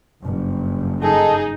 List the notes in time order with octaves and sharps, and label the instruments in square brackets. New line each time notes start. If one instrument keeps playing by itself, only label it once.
[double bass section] F#1 G2
[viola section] D#4 [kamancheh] G#4 [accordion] A4